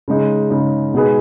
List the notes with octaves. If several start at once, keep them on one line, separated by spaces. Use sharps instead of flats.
C#3 G#3 D#4
C#3 G#3 D#4
B2 G#3 D#4 G#4 B4